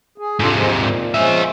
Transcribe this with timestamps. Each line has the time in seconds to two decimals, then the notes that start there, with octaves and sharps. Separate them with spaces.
0.18 G#4
0.40 G#2 C3 D4 F4 A4
0.55 F3 G#3
0.71 A#2
1.14 F3 G#3 C#4 G#4 E5